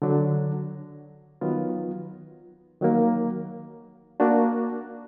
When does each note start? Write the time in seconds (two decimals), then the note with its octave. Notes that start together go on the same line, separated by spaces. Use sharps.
0.02 D3 F#3 D4
1.41 D#3 F#3 B3 F4
2.81 D#3 F#3 A#3
4.20 A#3 D4 F#4